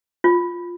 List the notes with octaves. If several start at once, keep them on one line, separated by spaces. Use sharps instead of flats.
F4